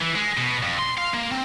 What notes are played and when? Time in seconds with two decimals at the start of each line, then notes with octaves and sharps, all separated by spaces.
0.01 E3
0.15 G#3
0.37 B2
0.63 F2
0.79 C6
0.98 F5
1.14 A#3
1.32 C4